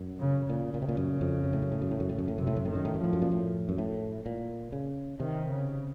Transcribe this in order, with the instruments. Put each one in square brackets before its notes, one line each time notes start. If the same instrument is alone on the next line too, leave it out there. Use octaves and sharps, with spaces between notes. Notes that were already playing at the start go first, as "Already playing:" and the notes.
Already playing: [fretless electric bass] F#2
[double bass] C#3
[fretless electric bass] A#2 [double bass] C#3
[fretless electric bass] A#2
C3
A#2
F#2
F2
F#2
A2
F#2
A2
F#2
A2
F#2
A2
F#2
A2
[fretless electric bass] F#2 [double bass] C3
[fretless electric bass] A2
F#2
[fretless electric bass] A2 [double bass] D#3
[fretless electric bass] F#2
A2
F#2
[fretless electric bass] A2 [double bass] F3
[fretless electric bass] F#2
A#2
A2
F#2
A2
A#2
C#3
[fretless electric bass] C3 [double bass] D#3
[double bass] C#3